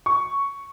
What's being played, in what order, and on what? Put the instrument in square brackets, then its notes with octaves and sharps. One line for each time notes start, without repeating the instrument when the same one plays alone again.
[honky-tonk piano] C#6